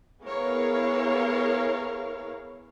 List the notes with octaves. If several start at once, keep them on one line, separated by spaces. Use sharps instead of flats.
B3 E4 G#4 A#4 C#5 F5